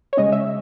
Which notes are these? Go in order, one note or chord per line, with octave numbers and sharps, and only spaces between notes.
C#5
C#3 G#3 C#4 D#5
E5